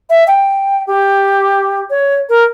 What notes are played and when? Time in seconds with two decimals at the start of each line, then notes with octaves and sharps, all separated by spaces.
0.10 E5
0.28 G5
0.87 G4
1.90 C#5
2.29 A#4